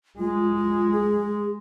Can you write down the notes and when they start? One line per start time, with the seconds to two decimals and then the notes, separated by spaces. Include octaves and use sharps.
0.19 G#3 F4
0.55 F4
0.92 G#4